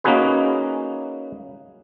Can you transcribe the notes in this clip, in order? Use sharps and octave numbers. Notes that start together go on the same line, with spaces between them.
A#3 C#4 D#4 F#4 G#4 B4